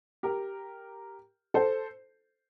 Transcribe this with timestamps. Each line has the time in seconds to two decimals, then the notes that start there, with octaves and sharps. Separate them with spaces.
0.23 G4 A#4
1.54 A4 C5